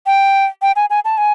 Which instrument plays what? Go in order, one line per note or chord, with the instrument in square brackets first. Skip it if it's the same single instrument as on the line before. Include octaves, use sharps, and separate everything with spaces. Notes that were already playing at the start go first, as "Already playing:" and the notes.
[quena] G5
G5
G#5
G#5
A5
G#5